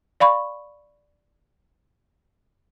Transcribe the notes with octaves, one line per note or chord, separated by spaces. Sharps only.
D5 F5 B5 C#6